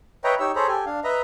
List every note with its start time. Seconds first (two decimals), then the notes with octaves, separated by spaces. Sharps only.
0.24 B4 C#5 D#5 E5 G5 A#5
0.40 D#4 G4 C#5 E6
0.56 G#4 A4 C5 C#5 A#5 B5
0.68 G4 A4 G#5
0.86 D4 F5
1.04 B4 D#5 E5 A#5